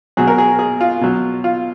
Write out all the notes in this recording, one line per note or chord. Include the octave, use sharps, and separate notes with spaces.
B2 F#3 G#4
A#4
G#4
G#4
F4
B2 F#3
F4